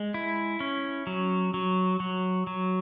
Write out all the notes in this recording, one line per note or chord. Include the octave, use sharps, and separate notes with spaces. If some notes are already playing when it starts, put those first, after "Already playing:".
Already playing: G#3
E4
C#4
F#3
F#3
F#3
F#3